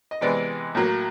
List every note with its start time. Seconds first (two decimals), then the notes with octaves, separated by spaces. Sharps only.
0.11 D#5
0.21 C3 E3 G#3 B3 D5
0.75 A2 F#3 A#3